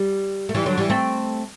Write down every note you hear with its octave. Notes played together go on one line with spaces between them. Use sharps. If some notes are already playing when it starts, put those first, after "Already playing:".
Already playing: G3
A3
E3 G3
D3 F#3
E3 G3
A3 C4